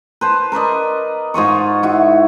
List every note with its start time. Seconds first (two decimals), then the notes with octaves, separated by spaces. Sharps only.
0.21 B4 C5 A5
0.52 A#4 B4 D5 D#5
1.34 G#2 F4 D#5 C#6
1.83 E4 F#4